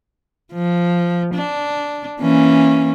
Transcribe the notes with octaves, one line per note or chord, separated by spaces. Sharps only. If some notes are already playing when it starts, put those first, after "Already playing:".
F3
D4
E3 A#3 C#4